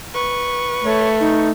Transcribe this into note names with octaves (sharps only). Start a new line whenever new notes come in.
B4 C#6
A3 C#5
D#4